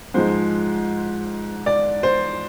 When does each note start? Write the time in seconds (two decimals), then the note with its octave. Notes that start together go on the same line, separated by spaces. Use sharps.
0.14 G#2 F3 G#3 C5
1.66 D5
2.03 C5